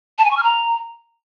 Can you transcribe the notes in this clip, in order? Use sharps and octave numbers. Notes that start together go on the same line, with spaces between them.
A5
G#5
C#6
F6
A#5